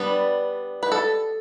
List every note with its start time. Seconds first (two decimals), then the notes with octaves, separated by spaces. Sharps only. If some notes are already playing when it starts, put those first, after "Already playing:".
Already playing: G3 B3 D4
0.83 B4
0.92 A4